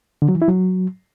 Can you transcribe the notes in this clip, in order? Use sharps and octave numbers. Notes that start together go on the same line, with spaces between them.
D3
F#3
E3
E4
F#3